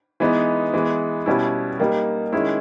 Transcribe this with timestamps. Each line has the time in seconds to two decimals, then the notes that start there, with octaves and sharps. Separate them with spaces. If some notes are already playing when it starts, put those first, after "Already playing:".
0.20 E3 G#3 B3 D#4
0.74 E3 G#3 B3
1.26 B2 G3 C#4 E4
1.80 G3 A#3 D#4
2.33 D#3 G#3 C#4 E4